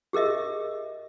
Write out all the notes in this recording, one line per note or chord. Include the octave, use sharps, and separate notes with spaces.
G4 G#4 A#4 D#5 E5